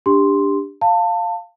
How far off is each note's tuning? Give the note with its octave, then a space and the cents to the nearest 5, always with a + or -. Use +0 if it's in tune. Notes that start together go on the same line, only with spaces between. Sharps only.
D4 +0 G4 +20 C6 +0
F5 +0 A5 +25